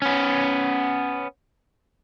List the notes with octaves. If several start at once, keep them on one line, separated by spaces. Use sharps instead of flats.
B3 C#4